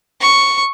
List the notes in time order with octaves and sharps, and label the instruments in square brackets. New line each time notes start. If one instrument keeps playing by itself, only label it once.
[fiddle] C#6